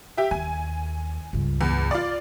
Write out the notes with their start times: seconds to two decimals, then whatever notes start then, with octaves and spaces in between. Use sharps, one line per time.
0.17 G4 E5
0.31 D#2 G#5
1.33 C#2 G2
1.61 E2
1.91 F4 D5